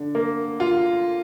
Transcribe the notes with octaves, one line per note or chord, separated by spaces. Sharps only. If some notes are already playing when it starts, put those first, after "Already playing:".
Already playing: D3
A#3
F4